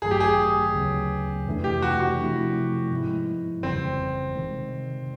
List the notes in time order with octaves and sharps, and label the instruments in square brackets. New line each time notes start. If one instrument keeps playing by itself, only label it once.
[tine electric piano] A1 G2 D#3 F#3 A3 [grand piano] G#4
[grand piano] G4
G#4
[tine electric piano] D2 C#3 F#3 B3
F2 C3 E3 A3 D4
[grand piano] G4
F#4
F#4
[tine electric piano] C3 F3 A3 C4 E4
G#2 F3 G#3 B3 E4
[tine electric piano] G1 F2 C#3 E3 G3 [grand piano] C4
[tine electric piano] C3 D#3 G#3